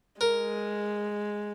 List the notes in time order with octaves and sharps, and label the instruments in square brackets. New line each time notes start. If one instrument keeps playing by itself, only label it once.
[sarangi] G#3 [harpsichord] A#4